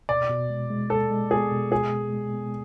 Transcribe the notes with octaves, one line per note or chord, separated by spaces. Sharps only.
B2 D5
B2
G#3
G#3
G#3 A4
G#3
B3 G#4
B2
G#3 G#4
G#3
G#3
B3